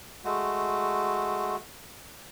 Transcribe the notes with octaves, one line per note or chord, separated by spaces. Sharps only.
G#3 A3 F#4